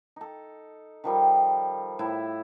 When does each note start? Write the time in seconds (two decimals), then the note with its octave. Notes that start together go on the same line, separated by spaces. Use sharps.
0.16 D#4 A4
1.04 D#3 F3 G3 A4
1.99 A2 E4 E5